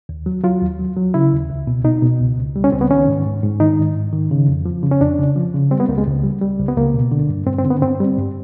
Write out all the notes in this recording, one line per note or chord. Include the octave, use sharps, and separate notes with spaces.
D#2
F#3
F#3 F4
D#2
F#3
F#3
C#3 E4
D#2
C#2
B2
B2 D#4
B2
C#2
C#2
G3
C#4
C#2 C4
B3
D#3 C#4
G#2
G#2
G#2
D#3 D#4
G#2
G#2
D#3
C#3
F2
F3
C#3
C#4
F2 D4
C#3
F3
C#3
G3 C4
B3
C#2 A#3
G#3
C#2
G3
G3
C#2
B3
C#2 A#3
B2
D3
G2
G2 C4
C4
D3
B3
G2 C4
G3
G2